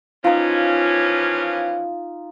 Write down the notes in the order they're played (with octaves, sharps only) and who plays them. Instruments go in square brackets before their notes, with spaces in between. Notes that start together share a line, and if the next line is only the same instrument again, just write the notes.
[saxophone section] E3 F3 C#4 [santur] D#4 F4